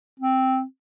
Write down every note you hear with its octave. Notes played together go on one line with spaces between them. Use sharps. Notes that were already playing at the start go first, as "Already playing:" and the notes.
C4